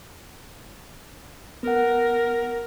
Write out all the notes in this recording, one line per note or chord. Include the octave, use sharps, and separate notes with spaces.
B3 A#4 F#5